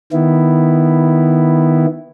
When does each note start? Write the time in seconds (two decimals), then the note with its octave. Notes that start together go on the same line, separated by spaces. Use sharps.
0.12 D#3 B3 E4